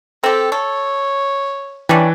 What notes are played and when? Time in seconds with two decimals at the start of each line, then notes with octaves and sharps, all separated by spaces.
0.24 C4 G4 A4
0.52 A4 C#5
1.89 E3 G3 C#4 D4